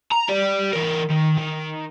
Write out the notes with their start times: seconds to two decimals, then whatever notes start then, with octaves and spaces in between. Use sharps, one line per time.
0.12 A#5
0.28 G4 D5
0.73 E3 A#4
1.10 D#3
1.38 D#3